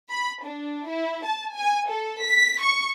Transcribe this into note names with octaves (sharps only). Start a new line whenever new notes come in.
B5
D4
E4
A5
G#5
A4
B6
C#6